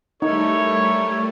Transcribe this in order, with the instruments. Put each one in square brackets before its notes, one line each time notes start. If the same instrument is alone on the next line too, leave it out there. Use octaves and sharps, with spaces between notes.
[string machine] G3 A3 [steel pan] D#4 [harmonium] E4 A4 A#4 [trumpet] C#5